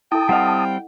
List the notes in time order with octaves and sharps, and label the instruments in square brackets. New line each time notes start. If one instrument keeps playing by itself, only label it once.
[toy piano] E4 A4 [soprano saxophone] G5 [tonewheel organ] A5 D#6
[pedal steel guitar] G3 C4 F5 [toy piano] D#5 F#5